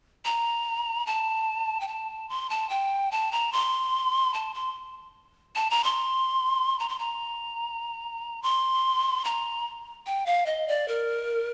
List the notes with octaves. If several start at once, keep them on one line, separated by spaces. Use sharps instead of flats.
A#5
A5
G5
A5
C6
A5
G5
A5
A#5
C6
A5
C6
A5
A#5
C6
A#5
C6
A#5
C6
A#5
G5
F5
D#5
D5
A#4